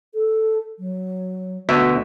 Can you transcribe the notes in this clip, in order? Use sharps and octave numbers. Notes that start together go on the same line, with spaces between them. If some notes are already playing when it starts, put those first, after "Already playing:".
A4
F#3
D2 B2 E5